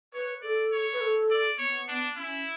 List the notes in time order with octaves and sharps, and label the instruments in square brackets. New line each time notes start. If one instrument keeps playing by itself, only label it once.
[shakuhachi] B4 [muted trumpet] C#5
[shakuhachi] A4 [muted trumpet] D5
[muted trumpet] C#5
[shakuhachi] B4
A4
[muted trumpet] D5
[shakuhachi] B3 [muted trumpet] C#5
[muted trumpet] D4
[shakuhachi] C#4 [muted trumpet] E4